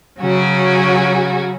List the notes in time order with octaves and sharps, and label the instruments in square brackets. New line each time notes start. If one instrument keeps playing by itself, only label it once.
[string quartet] C#3 F#3 C#4 F#4